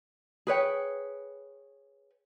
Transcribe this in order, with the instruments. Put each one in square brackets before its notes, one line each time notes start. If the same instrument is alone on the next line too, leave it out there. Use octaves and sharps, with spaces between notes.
[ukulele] G#4 B4 C#5 G5